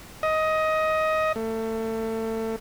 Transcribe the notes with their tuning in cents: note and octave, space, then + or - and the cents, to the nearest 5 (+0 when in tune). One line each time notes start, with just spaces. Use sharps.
D#5 +15
A3 +25